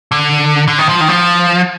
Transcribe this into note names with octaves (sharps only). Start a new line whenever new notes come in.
D3
D3
D#3
F3
D#3
F3